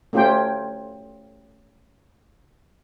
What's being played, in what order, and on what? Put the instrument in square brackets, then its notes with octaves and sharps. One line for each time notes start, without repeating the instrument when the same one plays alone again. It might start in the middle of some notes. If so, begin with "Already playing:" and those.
[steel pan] A3 C#4 F4 G4 C5 G5